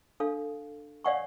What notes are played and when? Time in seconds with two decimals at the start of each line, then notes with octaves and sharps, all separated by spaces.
0.20 D4 A4 F5
1.04 C#5 D5 F5 F#5 G#5 C#6